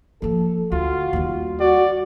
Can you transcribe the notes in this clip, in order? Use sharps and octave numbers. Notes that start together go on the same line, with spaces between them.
F3 A#3 A4
D2 F4 F#4
D#2 G3
F#4 D5